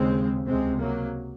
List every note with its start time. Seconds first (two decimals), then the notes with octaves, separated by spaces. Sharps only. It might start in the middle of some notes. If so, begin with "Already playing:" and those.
Already playing: D#2 C#3 G#3 C4
0.46 C#2 C3 G#3 C4
0.80 F#3 A#3